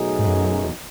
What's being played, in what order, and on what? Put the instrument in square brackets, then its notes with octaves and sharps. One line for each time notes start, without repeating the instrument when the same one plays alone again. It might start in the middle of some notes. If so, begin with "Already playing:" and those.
Already playing: [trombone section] B2 F#3 A3 D#4 G#4
[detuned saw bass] G#2
F#2
E2